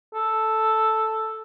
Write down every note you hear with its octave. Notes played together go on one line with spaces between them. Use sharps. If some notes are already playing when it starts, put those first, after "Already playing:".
A4